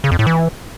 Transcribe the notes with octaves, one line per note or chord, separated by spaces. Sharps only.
C#3
F2
A2
E3